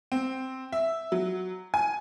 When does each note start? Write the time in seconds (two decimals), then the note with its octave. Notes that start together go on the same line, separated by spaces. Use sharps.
0.12 C4
0.72 E5
1.12 F#3
1.74 G#5